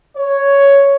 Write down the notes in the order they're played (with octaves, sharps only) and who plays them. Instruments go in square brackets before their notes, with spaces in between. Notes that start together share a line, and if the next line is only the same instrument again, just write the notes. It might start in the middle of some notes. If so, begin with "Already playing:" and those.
[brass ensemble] C#5